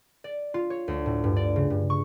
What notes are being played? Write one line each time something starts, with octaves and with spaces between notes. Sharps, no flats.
D5
F4
C#5
D2
A2
G2
D5
C#3
G2
C#6